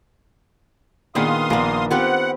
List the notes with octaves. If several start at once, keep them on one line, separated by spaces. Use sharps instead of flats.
A#2 D#3 B3 D4 G#4 F5 C6 D#6
A#1 A#3 B3
B3 C4 F4 G4 F#5